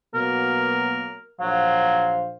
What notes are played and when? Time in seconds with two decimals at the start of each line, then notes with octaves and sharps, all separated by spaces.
0.14 B2 F#3 A#3 A#4
1.40 A#1 F#3 C5 F5